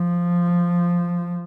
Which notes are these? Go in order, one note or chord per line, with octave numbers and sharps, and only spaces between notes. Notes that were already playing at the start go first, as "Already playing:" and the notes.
Already playing: F3